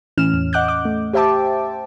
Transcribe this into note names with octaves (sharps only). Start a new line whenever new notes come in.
A2 E3 C#4 F6 E7
E2
D#5 F#5 D6 F#6 G6
D6
A3
G4 C5 E5 G5 A5 D6